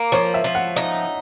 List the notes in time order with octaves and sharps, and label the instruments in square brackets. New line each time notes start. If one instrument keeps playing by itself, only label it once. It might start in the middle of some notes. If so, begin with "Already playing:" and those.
Already playing: [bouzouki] A#3
[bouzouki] F3 [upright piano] C#5
[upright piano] E5
[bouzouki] F3
[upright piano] F#5
[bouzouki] D#4